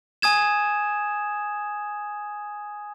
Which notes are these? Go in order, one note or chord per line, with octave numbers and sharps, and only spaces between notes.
G#5 D#6 G#6 E7